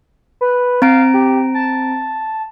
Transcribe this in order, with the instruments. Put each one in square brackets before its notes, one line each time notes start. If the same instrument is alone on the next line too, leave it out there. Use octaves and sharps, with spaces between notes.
[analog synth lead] B4
[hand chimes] C4 A#5 D7 [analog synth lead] F5
[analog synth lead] G4
A5